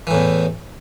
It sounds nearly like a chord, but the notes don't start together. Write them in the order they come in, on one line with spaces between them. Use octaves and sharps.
E3 A2 E2